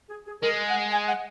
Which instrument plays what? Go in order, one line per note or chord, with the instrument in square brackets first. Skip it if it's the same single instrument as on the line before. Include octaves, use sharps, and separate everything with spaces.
[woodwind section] G#4
G#4
[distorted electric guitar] G#3 [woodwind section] A#4
[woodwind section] F#5
G#5
F#5